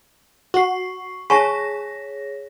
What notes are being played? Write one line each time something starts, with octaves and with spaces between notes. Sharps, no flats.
F#4 C#6 C7
G#4 C#5 G#5 A5 C#6 A#6